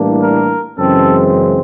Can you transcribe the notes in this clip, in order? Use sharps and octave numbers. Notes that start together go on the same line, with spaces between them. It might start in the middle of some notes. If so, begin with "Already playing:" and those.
Already playing: A2 E3 G3 A#3 D4
A#4
F#2 C#3 E3 G#3 C4 A4